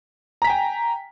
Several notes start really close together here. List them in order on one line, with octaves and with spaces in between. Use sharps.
A#5 B6 G#5 G5